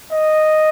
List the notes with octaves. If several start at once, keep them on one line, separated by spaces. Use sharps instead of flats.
D#5